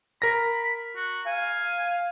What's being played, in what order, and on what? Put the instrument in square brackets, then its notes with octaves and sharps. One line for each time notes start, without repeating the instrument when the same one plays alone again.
[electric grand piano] A#4 A#6 [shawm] B5
[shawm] F#4
[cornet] F5 [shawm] G#5